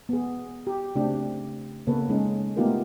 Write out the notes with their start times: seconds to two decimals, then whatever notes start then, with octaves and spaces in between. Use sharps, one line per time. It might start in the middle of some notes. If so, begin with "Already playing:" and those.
0.09 B3 G#4
0.67 G4
0.95 C#3 A3 C4 D4 G4
1.87 C#3 A#3 B3 A4 B4 C#5
2.09 G#3 C#4 D#4
2.56 A3 B3 D#4 F4 G4 A#4